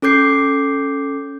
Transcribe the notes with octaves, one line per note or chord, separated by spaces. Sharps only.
C#4 A4 D6 G6 C7